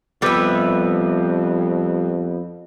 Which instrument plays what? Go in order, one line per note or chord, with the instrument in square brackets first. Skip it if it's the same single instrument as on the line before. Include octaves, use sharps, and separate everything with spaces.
[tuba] F2 [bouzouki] G3 E5 [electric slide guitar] B3 G4 B4